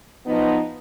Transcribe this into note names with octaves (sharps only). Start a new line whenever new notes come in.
F3 B3 D#4